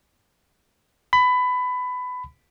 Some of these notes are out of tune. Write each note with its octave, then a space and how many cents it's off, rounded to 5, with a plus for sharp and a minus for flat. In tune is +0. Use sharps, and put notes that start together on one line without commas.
B5 +20